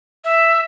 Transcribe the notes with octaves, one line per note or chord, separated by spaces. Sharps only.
E5